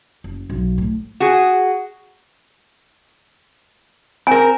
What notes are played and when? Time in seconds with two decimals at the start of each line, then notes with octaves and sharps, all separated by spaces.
0.24 F#1
0.49 B1
0.78 A2
1.20 F#4 G#4
4.27 C4 A#4 G#5